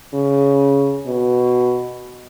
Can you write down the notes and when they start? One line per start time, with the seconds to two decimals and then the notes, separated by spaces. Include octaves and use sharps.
0.14 C#3
1.07 B2